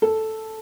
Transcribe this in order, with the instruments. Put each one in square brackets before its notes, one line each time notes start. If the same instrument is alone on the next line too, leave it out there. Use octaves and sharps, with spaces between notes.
[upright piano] A4